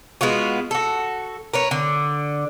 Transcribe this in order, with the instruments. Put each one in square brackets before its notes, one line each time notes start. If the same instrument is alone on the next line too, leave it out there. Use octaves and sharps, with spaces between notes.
[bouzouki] G#3 B3 F4 F#4
F#4 A4
A#4 B4 C#5
D3